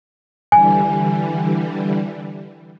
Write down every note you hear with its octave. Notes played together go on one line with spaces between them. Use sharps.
D3 E3 G3 G#5